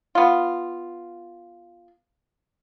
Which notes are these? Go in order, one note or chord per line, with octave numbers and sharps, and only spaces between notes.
B3 F4